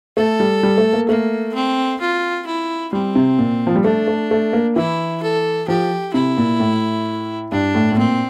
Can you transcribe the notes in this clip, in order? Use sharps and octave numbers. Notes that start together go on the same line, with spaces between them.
A3 A4
G3
G3
A3
A#3
A3 A#3
C4
F4
E4
G3 C4
C3
A#2
F3
G3
A3 D4
A3
A3
A#3
E3 E4
A4
F3 G4
C3 E4
A#2
A2
G2 D4
A2
A2
A#2 C4